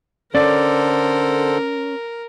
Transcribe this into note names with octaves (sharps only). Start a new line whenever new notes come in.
D3 C#4 A4 A#4 C5 D5